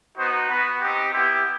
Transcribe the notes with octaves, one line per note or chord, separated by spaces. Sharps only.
B3 D#4 F#4 C5
B3 F#4 B4
C4 D#4 G4
B3 E4 G4